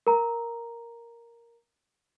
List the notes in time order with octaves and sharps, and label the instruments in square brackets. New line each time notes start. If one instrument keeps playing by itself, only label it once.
[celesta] A#4 A#5